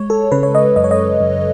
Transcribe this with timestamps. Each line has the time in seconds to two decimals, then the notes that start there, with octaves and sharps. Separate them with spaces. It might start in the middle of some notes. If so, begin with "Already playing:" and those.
Already playing: G#3 C#5
0.10 A4
0.32 C#3 B4
0.43 C#5
0.55 D#5
0.76 F#2 D#5
0.84 C#5
0.91 D#5
1.21 F#2